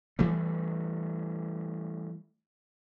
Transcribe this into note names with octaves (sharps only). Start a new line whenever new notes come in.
E3 G3 A3